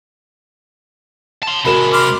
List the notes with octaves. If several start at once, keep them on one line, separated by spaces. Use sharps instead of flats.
A5 C6
C3 G#3 F#4 A#4 B5 E7
B5 C6 D6 F6